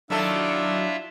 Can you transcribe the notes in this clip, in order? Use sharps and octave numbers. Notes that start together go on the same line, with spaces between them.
D#3 F#3 A3 D4 E4 F4 A4 E5